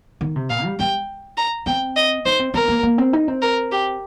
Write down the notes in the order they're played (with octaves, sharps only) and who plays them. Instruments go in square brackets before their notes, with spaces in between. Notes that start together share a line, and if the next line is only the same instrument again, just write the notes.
[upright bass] D#3
C3
[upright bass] A#2 [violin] F5
[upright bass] G3
[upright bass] G3 [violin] G5
[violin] A#5
[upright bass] C4 [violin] G5
[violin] D#5
[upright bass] D#4 [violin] C5
[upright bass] C4
[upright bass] C4 [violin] A#4
[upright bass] A#3
A#3
C4
D#4
C4
[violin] A#4
G4